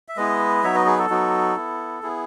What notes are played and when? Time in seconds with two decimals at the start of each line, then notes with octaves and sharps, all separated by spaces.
0.08 E5
0.17 G#3 B3 E4 B4 D#5
0.63 F#3 B3 D#4 F#4 C#5 E5
0.75 B4 D#5
0.86 G#4 B4
0.98 F#4 A4
1.10 F#3 B3 D#4 F#4
1.56 B3 E4
2.03 B3 E4 G#4